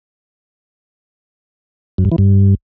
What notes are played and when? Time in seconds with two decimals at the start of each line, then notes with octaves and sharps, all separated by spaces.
1.98 F#2
2.05 G2
2.12 E3
2.18 G2